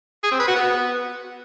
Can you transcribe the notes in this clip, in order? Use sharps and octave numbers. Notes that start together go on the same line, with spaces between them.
G#4
C4
B4
F#4
B3